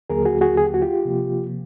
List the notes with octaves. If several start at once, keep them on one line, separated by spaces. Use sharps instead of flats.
D#2 D3 F#3 A#3 G#4 A#4
F#4 G#4
F#4 G#4
G#4
G4
F#4
F4 G4
C3 F3 A#3